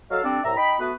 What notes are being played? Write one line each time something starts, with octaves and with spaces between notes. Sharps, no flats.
F#3 A4 D#5 F5
G3 C4 D4 A4 D5
C2 A2 E5 A#5
D#4 G5 B5
A3 B3 F#4 B4